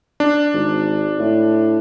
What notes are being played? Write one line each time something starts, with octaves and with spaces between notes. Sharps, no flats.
D4
G#1
A2